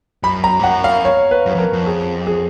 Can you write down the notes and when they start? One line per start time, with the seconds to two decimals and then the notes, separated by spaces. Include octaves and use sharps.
0.23 F#2 B5
0.44 A#5
0.59 G#2
0.64 F#2 F#5
0.84 F5
1.05 C#5
1.31 B4
1.46 F#2
1.51 B4
1.55 F2 A#4
1.73 F2
1.86 G#4
2.27 G#4